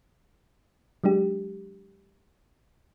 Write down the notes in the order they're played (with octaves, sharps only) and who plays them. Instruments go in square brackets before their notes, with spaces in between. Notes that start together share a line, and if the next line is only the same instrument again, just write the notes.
[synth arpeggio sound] F#3 G#3 D4 G4